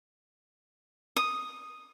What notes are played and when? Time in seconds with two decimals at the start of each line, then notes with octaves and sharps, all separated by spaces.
1.16 D#6